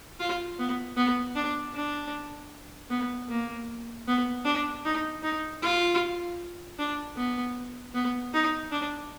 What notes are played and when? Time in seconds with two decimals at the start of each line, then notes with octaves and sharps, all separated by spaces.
0.20 F4
0.59 B3
0.97 B3
1.35 D4
1.75 D4
2.90 B3
3.29 A#3
4.08 B3
4.45 D4
4.85 D#4
5.23 D#4
5.62 F4
6.79 D4
7.17 B3
7.95 B3
8.34 D#4
8.72 D4